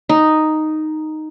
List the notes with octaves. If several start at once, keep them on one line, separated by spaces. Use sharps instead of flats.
D#4